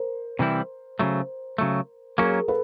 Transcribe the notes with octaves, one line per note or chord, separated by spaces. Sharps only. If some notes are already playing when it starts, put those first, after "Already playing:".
Already playing: A#4 C5
C3 E3 G3 C4 E4
C#3 F#3 A3
C#3 F#3 A3
F#3 A#3 C#4 G#4 A#4
A4 B4